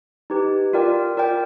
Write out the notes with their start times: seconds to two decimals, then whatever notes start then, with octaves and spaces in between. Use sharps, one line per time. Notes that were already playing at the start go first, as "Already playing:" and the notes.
0.30 D#4 G4 B4
0.73 F4 A#4 D5 G5
1.17 F4 A#4 D5 G5